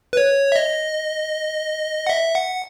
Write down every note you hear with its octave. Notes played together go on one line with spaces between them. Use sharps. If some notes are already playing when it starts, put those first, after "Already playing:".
B4
C#5
E5
D#5
F#5
E5
F#5